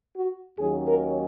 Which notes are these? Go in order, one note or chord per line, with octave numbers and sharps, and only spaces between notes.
F#4
D#2 D#3 F#3 C#4 G#4
A#4